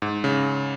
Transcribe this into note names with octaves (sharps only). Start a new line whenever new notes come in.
G#2
C#3